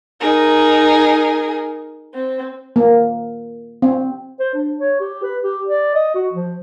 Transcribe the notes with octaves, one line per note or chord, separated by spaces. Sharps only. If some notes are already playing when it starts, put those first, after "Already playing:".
D#4 G#4 A#4
C4
A#3
C4
C5
D4
C#5
G4
B4
G4
D5
D#5
F#4
F3